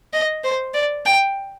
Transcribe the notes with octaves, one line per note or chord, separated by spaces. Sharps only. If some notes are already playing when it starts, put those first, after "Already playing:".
D#5
C5
D5
G5